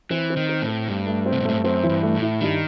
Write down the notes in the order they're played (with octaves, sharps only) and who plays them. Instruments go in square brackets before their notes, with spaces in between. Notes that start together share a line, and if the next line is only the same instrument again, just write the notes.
[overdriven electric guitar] E3 [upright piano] C4
[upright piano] C4
[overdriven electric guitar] D#3
[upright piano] C4
[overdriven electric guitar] A2
[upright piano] C4
[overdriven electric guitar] G2 [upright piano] A3
[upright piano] A3
C4
[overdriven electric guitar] C3
B2
[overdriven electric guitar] A2 [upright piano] A3
[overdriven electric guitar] G2
[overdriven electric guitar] F#2 [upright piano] C4
[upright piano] E3
[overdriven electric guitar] G2
[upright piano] A3
[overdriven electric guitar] A2
[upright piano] E4
[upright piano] G2 [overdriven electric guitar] D#3